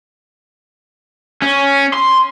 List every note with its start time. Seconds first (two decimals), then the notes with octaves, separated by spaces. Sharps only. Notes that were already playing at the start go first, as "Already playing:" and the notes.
1.42 C#4
1.94 C6